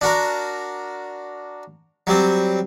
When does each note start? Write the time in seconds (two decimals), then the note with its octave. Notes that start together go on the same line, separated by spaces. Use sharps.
0.01 D4 F#4 A#4
2.07 F#3 G3 C4